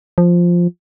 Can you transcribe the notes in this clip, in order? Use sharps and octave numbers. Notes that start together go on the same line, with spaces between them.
F3